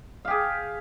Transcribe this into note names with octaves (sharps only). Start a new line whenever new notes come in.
G4 G#4 F5